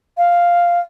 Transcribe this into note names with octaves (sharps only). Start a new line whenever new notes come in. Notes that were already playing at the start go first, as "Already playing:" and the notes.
F5